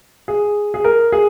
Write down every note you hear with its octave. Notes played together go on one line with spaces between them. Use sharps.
G#4
G#4
A#4
G#4